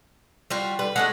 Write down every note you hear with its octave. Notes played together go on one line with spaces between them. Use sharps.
G3 F4 F#4
D3 G3 B4
G#3 A3 D4 F#5